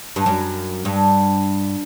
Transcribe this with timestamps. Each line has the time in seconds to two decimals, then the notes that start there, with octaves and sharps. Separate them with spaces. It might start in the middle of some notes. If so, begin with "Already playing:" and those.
0.16 G2
0.26 F#2
0.85 G2